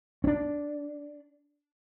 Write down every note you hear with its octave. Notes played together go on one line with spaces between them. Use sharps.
C#4 D4